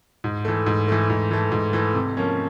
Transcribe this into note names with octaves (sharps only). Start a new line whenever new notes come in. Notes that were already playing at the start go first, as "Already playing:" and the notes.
G#2
E3 A3
G#2
E3 A3
G#2
E3 A3
G#2
E3 A3
C3
F3 A#3 C#4